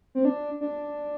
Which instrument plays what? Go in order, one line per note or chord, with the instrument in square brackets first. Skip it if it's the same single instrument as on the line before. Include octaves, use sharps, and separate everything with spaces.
[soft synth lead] C4
D4
D4